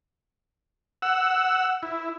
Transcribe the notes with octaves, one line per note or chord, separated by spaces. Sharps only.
F#5 E6
E4